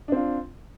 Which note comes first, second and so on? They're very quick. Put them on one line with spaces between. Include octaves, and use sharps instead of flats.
D4 C4 F4